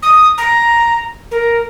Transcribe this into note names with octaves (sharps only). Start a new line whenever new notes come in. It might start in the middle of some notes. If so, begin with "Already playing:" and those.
D#6
A#5
A#4